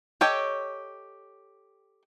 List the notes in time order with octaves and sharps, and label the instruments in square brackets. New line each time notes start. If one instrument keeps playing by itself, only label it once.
[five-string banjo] G4 A4 C#5 D#5 G5